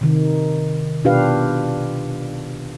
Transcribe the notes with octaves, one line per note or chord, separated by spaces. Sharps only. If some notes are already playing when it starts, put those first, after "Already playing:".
C3 D#3
B2 D4 F4 G4 B4 F5